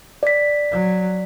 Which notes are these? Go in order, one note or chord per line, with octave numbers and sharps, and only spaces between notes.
D5 B6
F#3